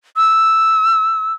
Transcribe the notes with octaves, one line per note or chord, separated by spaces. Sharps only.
E6